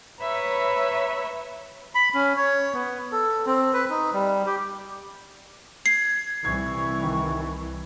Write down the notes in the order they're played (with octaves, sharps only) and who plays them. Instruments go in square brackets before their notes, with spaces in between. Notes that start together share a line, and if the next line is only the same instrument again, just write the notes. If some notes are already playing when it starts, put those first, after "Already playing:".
[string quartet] B4 C#5 E5 A#5 B5
[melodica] B5
C#4
C#5
B3
A4
C4
B4
D#4
G3
G4
[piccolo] G#6 [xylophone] C7
[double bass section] C2 E3 [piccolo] C#6 [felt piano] G#6
[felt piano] D#3